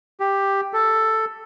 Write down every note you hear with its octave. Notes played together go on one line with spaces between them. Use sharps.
G4
A4